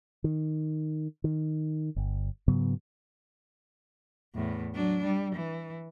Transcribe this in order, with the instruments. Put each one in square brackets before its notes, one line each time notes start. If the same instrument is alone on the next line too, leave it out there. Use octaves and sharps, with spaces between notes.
[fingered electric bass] D#3
D#3
G1
G#2 C#3 F#3 B3
[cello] E2 A2
F#3 D4
G3
E3